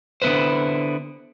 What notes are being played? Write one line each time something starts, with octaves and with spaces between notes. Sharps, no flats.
D3 B3 E4 B4 C5